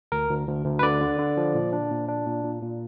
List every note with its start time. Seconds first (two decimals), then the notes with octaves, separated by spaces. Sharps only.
0.12 D2 A#4
0.30 D2
0.47 D2
0.66 D2
0.79 B4
0.83 D3 D5
1.01 D3
1.19 D3
1.37 F3
1.55 A#2
1.73 D4
1.91 A#2
2.08 D4
2.26 A#2
2.44 A#2
2.62 A#2